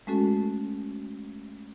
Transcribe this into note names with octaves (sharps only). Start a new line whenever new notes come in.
G#3 A3 C#4 F#4 A4